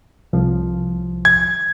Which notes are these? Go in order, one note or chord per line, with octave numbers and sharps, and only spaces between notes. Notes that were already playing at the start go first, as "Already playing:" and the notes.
C2 F3
G#6